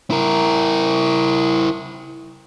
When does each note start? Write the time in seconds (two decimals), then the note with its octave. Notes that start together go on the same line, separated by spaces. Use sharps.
0.11 E4 A#4